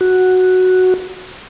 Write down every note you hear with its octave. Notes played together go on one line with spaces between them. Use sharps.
F#4